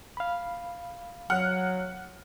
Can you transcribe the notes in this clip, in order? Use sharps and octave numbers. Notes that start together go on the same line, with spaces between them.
F5 B5
F#3 F#5 F6